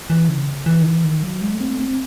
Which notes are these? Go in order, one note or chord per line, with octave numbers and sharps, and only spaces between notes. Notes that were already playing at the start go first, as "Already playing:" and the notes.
E3
C#3
E3
D#3
E3
D#3
F#3
G#3
A3
C4
A3
C4